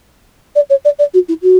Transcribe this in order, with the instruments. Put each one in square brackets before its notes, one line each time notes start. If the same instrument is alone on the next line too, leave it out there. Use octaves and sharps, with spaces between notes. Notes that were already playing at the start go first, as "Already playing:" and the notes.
[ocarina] D5
C#5
D5
D5
F#4
E4
F#4